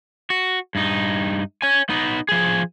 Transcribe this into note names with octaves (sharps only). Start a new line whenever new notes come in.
F#4
G2 D#4
C#5 G#5
B3 D#4
F3 G#4